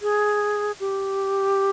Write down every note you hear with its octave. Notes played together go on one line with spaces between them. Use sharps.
G#4
G4